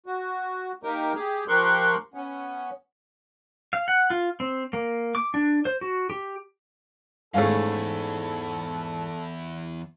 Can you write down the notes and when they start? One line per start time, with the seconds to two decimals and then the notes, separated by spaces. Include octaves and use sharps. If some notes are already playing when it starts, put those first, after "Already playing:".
0.06 F#4
0.83 A#3 D#4 G4 A#4
1.15 G4 G#4
1.48 F3 G4 A#4 C6 C#6 F#6
2.14 B3 C#4
3.73 F5
3.88 F#5
4.10 F4
4.40 C4
4.73 A#3
5.15 D6
5.34 D4
5.65 C5
5.81 F#4
6.10 G4
7.34 E2 G#2 A3 C#4 G#4 A4 F5